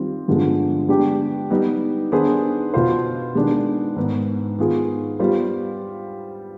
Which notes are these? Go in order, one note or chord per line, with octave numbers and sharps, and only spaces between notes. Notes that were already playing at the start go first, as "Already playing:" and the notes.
Already playing: D#3 G3 C4 F4
G2 D3 F3 G#3 B3
G#3 B3 D4 G4
G3 B3 D#4
D#3 B3 D4 G#4 C5
B2 B3 F4 C5
D#3 G#3 B3 D4
G#2 D#3 B3
D#3 B3 F4 G#4
G3 B3 F4 C5